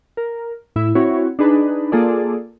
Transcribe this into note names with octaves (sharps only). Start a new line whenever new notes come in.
A#4
A2 E4 E5
C4 E4 F#4 C#5
D4 D#4 G#4 B4
A#3 F4 G#4 A4 D5